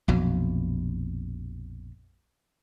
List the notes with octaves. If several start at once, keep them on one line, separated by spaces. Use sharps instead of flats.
A#1 F2 B2 F#3